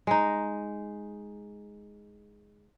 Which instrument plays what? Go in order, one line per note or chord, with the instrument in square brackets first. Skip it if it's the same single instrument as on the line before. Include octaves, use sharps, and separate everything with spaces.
[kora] G#3 D#4